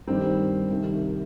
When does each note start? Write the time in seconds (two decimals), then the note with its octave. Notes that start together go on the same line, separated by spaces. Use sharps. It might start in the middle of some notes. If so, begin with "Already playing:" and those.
0.07 G2 D#3 G3 C4
0.71 C2 C3 D#3